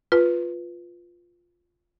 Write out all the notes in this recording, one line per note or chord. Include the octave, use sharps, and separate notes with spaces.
F4 B4